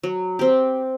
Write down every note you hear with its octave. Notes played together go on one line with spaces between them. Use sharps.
F#3
C4 G4